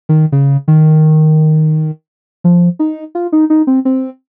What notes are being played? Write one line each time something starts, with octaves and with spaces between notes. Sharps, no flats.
D#3
C#3
D#3
F3
D#4
F4
D#4
D#4
C4
C4